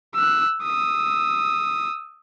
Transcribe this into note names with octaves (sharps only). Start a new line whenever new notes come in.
E6 F#6
D#6 E6